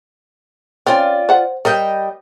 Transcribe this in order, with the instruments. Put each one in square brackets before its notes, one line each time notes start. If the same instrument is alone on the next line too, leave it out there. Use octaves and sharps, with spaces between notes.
[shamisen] C4 C#4 [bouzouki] F4 D5
[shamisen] C5 F#5
[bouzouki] G3 D#5 G5 [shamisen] A#4